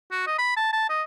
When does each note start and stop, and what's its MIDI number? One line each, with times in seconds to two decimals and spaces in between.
0.12 0.25 66
0.27 0.35 75
0.39 0.57 83
0.57 0.73 81
0.73 0.88 81
0.89 1.03 75